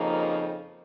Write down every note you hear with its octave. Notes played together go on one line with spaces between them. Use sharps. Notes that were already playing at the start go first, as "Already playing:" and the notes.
Already playing: F2 C#3 F3 A#3 D#4